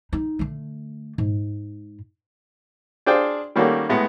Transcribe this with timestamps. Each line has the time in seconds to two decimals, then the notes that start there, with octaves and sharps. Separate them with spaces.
0.13 D#4
0.39 D3 A3
1.18 G#2
3.06 D4 G#4 C5 D5 F5 G5
3.56 D#3 G3 A#3 C#4 F#4 A4
3.89 A2 G#3 B3